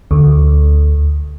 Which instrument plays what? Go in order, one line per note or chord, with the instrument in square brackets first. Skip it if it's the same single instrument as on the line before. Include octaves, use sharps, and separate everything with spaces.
[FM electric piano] D2